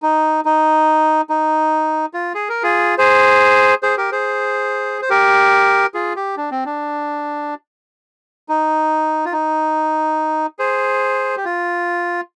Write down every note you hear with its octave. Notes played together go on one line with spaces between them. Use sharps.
D#4
D#4
D#4
F4
G#4
A#4
F4 G#4
G#4 C5
G#4 C5
G4 A#4
G#4 C5
C5
G4 A#4
F4 G#4
G4
D4
C4
D4
D#4
F4
D#4
G#4 C5
G4
F4